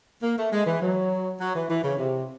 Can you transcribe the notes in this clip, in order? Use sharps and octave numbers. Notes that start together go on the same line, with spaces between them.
A#3
A3
G#3
E3
F#3
F#3
E3
E3
C#3
C3